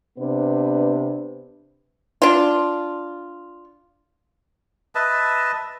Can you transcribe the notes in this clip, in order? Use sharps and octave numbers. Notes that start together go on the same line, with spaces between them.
C3 B3 D4 B4
D4 F4
B4 D#5 E5 A5